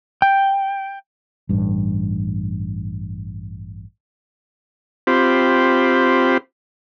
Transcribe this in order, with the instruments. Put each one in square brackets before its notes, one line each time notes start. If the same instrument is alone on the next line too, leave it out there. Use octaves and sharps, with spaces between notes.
[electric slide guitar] G5
[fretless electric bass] A1 G2
[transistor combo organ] C4 F4 G4 C5 B5